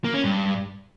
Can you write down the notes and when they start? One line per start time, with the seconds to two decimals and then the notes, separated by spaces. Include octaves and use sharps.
0.04 A#3
0.14 C#4
0.24 G2